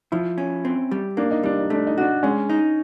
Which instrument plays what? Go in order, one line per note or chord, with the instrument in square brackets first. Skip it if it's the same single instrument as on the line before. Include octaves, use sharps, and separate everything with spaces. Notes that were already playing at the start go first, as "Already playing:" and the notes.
[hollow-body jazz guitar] F3 [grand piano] E4
[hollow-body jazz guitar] C#4
C4
G3
[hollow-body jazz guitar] A#3 [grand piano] D4
[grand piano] D#4
[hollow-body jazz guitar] G3 [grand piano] D4
[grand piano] D#4
[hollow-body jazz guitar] A3 [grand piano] D4
[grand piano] D#4
[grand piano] D4 [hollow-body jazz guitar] F#4
[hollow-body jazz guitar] G#3 [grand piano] C#4
[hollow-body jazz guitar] D#4